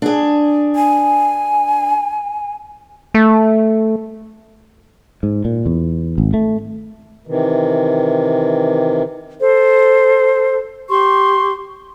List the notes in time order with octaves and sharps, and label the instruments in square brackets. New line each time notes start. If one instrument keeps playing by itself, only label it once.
[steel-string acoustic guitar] D4 G#4
[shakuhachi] G#5
[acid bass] A3
[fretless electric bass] G#2
A#2
E2
G#1
A3
[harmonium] C3 D#3 E3
[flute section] A4 C5
G4 C6 C#6